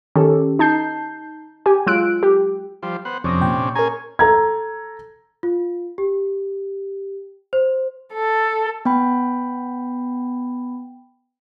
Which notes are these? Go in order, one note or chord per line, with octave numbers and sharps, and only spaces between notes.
D#3 C#4 G4 A4
D#4 A5 G6 C7
G4 G#5
F#3 G#3 F4 E6 F#6 D7
G4
F3 G3 C5
B3 C5 F#5
F2 C3 C#4 D4 D#6 A#6
A#2 G5
C#4 G#4 A#4 G#5 A#5
A4 A#5 G#6
F4
G4
C5
A4
B3 G5 B5